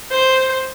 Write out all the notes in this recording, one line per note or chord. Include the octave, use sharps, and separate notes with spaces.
C5